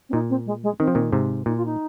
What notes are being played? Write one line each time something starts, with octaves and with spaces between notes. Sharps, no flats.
C4
A#2 D#4
C4
G#3
G#3
D#3 C4
F3
A#2 D#3
G#2 C3
A#2 D#4
F4
D#4